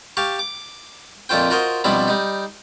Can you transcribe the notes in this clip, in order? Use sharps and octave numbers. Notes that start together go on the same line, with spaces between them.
G4 F5 A5 C#6
D6
F2 A#2 A3 F4 C5 G5
F4 F#4 A#4 C5 D#5
B2 F3 G3 C4 D4 E4
G3 D#4